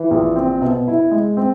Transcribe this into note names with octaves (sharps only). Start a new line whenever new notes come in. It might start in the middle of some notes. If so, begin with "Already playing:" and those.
Already playing: E3
A#1
C4
B2
E4
G#3
C4